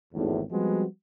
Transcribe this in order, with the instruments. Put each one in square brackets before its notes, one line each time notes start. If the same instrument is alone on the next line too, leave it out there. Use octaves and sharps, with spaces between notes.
[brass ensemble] G#1 E2 A2
F3 G3 G#3 B3 C4 F#4